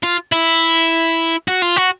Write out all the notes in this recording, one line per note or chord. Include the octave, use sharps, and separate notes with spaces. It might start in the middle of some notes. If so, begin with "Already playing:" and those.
F4
E4
F#4
F4
F#4